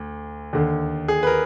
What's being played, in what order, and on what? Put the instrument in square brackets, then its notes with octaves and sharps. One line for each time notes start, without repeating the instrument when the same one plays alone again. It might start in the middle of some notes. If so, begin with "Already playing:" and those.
Already playing: [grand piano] D2
D#2 D3
G#4
B4
A#4